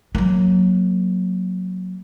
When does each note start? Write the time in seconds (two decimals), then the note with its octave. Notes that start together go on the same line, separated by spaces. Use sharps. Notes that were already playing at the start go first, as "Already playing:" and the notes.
0.15 F#3 A#3